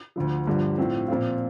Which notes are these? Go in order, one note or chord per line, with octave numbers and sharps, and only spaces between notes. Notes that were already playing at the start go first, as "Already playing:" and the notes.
D2 D3 F3
G1 G2 D3 F3
A2 F3 C4
A#2 F3 C4 F4